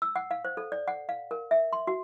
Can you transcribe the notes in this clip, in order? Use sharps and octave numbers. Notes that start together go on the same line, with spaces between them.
E6
F#5
F5
C5
A4
D5
F#5
F5
A#4
E5
C6
F#4